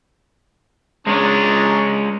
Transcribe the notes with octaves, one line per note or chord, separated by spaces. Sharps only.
G#3 C#4 D4 C#5 A#5